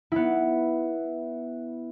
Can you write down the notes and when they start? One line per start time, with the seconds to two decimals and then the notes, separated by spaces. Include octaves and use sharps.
0.12 B3 E4